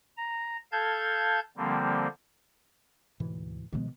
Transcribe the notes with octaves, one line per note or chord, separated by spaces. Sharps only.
A#5
A4 F5 A5 G6 G#6
D3 F3 G3 A#3 C4
D2 G#2 B2 E3
B2 D#3 F3 G#3 B3